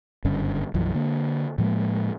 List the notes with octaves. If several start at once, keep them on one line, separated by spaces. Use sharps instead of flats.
F#1 G2 D3 C#4
B1 F#2 E3 F3
D3 A#3
A2 F3 G#3 A#3